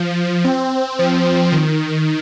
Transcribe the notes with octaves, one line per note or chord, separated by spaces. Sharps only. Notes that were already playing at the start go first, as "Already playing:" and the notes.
Already playing: F3
C4
F3
D#3